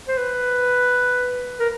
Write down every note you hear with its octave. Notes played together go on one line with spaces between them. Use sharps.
C5
B4
A#4